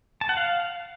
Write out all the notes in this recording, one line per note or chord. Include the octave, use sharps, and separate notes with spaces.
A5
F#5
F5